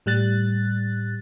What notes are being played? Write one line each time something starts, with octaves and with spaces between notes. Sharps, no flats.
A2 G3 F#6 A6